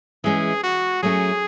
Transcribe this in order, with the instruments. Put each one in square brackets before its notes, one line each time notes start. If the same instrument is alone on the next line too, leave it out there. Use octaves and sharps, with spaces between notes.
[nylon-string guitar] E3 G#3 C#4 [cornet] G#4
[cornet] F#4
[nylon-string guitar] F#3 A3 C#4 [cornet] G#4